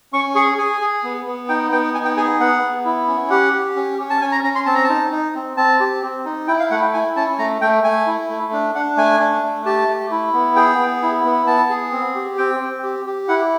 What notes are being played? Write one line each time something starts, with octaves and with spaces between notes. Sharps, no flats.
C#4 C#6
G#4 C#6
G#4 G#5
G#4
B3
B3
D#4 G5
B3 G5
D#4 G#5
G5
G#4 G#5
B3 F#5
B3
E4
C#4
G4 F#5
G4
C#4
C#4
A5
C#4 G#5
A#5
C#4 A#5
C6
C4 A5
A#5
A5
D#4
D#4
C4
C4 A5
G4
C4
D#4
E4 G5
F5
A3 F#5
G5
E4 G#5
C#4 A5
A3 A#5
A3 G5
A3 G#5
E4
A3
D4
D4 F#5
A3 G#5
D4
A3
G4 A5
A3
E4
B3
G#4 G5
B3
E4
B3
B3 A5
G#4
C4
G4
C4 G5
C4
G4
G4
E4 F#5